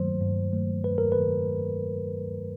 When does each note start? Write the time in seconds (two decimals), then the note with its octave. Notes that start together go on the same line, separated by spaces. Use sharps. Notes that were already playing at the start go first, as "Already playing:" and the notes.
Already playing: G2 D#3 F#3 A3 C5
0.20 G2
0.52 D#3 F#3 A3
0.84 G2 B4
0.98 A#4
1.12 D#3 B4